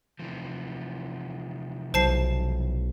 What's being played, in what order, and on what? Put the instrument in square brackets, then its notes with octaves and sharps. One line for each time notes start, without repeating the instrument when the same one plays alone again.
[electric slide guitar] C3 E3 F3
[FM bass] B1 [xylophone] C5 A5 C7